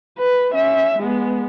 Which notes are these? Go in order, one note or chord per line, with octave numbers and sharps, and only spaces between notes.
B4
C#4 E5
G#3 B3